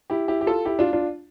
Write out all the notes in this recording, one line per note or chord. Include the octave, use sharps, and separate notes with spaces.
E4 G4
E4 G4
G4
F4 A4
E4 G4
D4 F4
D4 F4